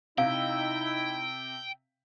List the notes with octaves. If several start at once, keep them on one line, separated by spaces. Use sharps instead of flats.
C3 D#4 E4 F5 G5